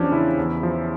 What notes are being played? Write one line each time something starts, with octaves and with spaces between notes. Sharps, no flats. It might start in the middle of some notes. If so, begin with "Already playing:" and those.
Already playing: E2 F3 C#4 D4 G4
C#3 E4
E2
F3